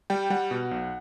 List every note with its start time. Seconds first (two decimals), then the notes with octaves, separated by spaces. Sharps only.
0.10 G3 G5
0.30 G3 F#5
0.51 B2
0.71 B1